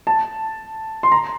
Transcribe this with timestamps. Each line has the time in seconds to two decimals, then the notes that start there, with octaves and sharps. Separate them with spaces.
0.07 A5
1.03 C6
1.12 A#5